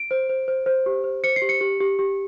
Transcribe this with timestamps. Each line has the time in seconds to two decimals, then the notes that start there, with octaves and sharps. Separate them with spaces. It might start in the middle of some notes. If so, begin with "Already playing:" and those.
Already playing: D7
0.11 C5
0.29 C5
0.48 C5
0.66 C5
0.86 G4
1.04 C5
1.23 C5 C#7
1.36 C7
1.42 G4
1.49 C#7
1.61 G4
1.80 G4
1.99 G4